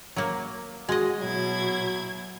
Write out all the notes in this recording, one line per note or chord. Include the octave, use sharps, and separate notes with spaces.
F#3 A#3
G#3 F#4 D#5
B2 F#3 E4 G#6